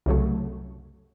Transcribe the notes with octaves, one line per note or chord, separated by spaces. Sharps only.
C2 F#2 C#3 F#3 A3